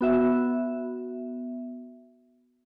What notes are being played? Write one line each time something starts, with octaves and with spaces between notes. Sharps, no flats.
B3 F#4 E5